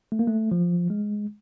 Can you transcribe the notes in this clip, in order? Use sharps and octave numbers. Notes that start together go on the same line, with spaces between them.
A3
A#3
A3
F3
G#3